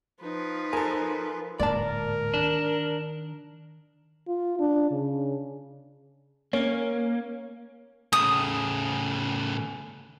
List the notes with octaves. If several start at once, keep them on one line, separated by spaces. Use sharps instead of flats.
F3 D#4 B4
A4 A#4 C5 G#5
D1 G#2 A#3 A#4 D5 A5
D#3 D4
F4
D4
C#3
A#3 C#4
A2 C#3 D#6